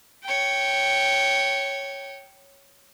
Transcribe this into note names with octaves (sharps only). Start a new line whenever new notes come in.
C#5 G5